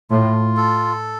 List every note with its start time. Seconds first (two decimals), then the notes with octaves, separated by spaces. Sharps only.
0.10 A2 F4
0.57 A4